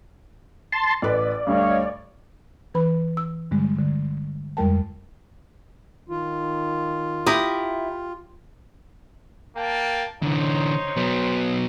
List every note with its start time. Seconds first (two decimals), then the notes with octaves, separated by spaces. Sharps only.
0.72 A5 C6
1.02 A1 B4 D5
1.47 D2 G2 C#5 D#5 F5
2.74 E3 B4 B5
3.17 E6
3.51 G2 D3 G3 G#3
3.79 D3
4.57 F2 G3 G#3 A#4 G5 A5
6.09 D#3 F4
7.26 E4 G4 A#5 D#6
9.56 A#3 G5 A5
10.23 D3 E3 D#4 C5 C#5
10.97 F#3 B3